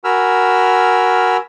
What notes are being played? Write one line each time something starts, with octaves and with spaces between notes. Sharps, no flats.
F#4 A#4 G#5 B5 E6 F6